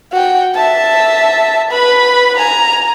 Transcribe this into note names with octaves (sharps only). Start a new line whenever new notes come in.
F#4 G5
E5 A5
B4 B5
G#5 A#5